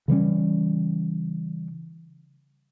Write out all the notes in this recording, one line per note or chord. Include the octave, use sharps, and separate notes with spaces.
C#3 E3 G3 C#4